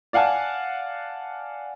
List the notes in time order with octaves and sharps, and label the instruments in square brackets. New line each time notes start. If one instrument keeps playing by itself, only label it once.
[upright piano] D5 F5 F#5 G#5 A5